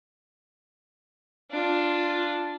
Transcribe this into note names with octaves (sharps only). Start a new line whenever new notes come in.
D4 F4